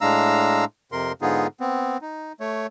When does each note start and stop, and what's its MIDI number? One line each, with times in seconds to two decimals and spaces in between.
0.01 0.65 45
0.01 0.65 56
0.01 0.65 62
0.01 0.65 77
0.01 0.65 82
0.01 0.65 88
0.92 1.12 41
0.92 1.12 48
0.92 1.12 70
0.92 1.12 84
1.22 1.47 44
1.22 1.47 50
1.22 1.47 59
1.22 1.47 63
1.22 1.47 65
1.22 1.47 68
1.60 1.97 59
1.60 1.97 60
2.02 2.32 63
2.40 2.67 57
2.40 2.67 73